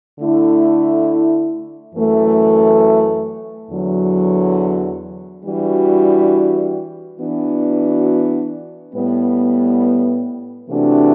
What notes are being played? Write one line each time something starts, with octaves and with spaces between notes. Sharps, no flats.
D3 A3 E4
F#2 E3 A3
E2 D3 F#3
E3 G3 D4 F#4
E3 B3 D4 F#4
A2 G3 B3
C3 E3 A3 D4 F#4